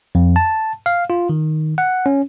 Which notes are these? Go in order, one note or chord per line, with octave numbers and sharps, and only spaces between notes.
F2
A5
F5
F4
D#3
F#5
C#4